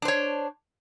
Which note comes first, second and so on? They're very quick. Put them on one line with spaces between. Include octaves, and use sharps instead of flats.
D4 C5 C#5